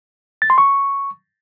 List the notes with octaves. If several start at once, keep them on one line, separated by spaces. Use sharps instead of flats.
A6
C6
C#6